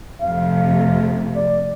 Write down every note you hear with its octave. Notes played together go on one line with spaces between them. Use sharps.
F2 C3 A3 F5
D5